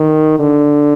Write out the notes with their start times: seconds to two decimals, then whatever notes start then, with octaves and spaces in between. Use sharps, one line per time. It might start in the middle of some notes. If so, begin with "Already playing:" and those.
Already playing: D#3
0.40 D3